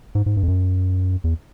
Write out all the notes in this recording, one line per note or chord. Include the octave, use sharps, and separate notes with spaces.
G#2
G#2
G2
F2
F#2
E2